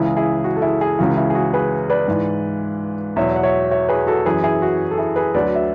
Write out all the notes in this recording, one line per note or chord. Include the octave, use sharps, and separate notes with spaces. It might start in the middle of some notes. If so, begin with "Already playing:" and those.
Already playing: C#2 C#3 E3 E4 G#4
E4 G#4
F#4
A4
E4 G#4
E4 G#4
C#2 C#3 E3 F#4
E4
G#4
F#4
G#4 B4
B4 D5
G#2 E3
E2 B2 F#3 C#5 E5
F#5
C#5 E5
C#5 E5
G#4 B4
F#4 A4
F#2 E3 G#4 B4
E4 G#4
F#4
A4
E4 G#4
G#4 B4
D2 D3 F#3 B4 D5
E5